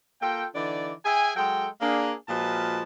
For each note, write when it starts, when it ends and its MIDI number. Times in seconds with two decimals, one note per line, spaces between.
0.22 0.45 58
0.22 0.45 65
0.22 0.45 69
0.22 0.45 79
0.55 0.92 50
0.55 0.92 52
0.55 0.92 63
0.55 0.92 74
1.05 1.31 68
1.05 1.31 76
1.05 1.31 79
1.05 1.31 80
1.36 1.66 54
1.36 1.66 56
1.36 1.66 69
1.36 1.66 79
1.81 2.13 58
1.81 2.13 62
1.81 2.13 68
2.29 2.83 46
2.29 2.83 53
2.29 2.83 56
2.29 2.83 66
2.29 2.83 71
2.29 2.83 81